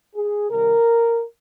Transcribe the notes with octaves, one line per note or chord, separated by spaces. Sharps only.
G#4
C3 D#3 G3 A#4